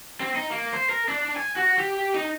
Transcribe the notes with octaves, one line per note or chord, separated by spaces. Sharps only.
C4
D#4
A#3
C5
A#4
D4
G#5
F#4
G4
D#4